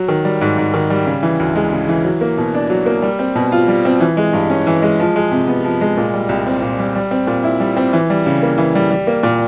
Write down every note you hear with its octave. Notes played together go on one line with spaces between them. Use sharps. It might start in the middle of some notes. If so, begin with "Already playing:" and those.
Already playing: F#3
D#3
G3
G#2
G#2
D#3
G3
C#3
E3
D2
G#3
C#3
E3
F#3
A#3
B2
D4
F#3
A#3
G3
C4
B2
F4
G3
C4
E3
G#3
G2
C#4
E3
G#3
F3
G#3
C3
B3
F3
G#3
A#2
G3
C2
C4
A#2
G3
G3
C4
A#2
E4
G3
C4
E3
G3
C#3
A#3
E3
G3
G3
A#3
A#2